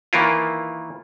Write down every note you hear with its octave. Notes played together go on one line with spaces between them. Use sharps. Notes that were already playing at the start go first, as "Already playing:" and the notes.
D#3 E3 A#3 E4 F4